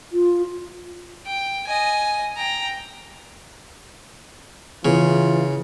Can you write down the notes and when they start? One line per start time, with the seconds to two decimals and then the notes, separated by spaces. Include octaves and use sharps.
0.12 F4
1.26 G5
1.67 D#5 G#5
2.36 G5 A#5
4.85 C#3 E3 F4